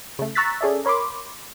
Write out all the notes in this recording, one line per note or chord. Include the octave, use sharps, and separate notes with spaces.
C#3 A3
A#5 C#6 E6 F#6 A6 B6
C#4 G#4 A4 D5 E5
A#4 C#5 B5 C6 D6